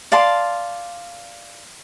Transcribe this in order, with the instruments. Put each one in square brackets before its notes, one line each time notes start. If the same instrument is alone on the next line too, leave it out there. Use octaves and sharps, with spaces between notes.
[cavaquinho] D5 F5 A5 C6